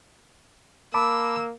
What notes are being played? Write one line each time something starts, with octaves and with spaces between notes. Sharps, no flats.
A#3 A5 B5 D6 E6